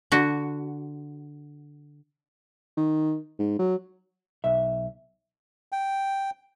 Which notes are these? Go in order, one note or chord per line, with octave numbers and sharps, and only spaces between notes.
D3 F#4
D#3
G#2
F#3
B1 E5
G5